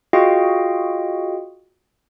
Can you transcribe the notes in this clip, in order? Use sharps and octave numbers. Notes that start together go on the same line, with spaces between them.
F4 F#4 G#4 D#5 F5 G5